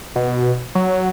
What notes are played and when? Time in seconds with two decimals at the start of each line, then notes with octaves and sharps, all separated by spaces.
0.16 B2
0.75 F#3